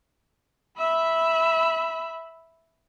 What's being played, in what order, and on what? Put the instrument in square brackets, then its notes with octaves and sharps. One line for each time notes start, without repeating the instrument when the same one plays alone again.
[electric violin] E5 B5